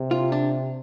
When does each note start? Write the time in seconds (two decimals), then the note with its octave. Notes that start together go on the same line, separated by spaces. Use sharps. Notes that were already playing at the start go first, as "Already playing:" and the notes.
Already playing: C3
0.11 F4
0.32 D4